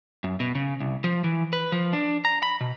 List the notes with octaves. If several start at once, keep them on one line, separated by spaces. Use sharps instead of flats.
F#2
B2
C#3
C2
F3
E3
B4
F3
D4
A#5
B5
B2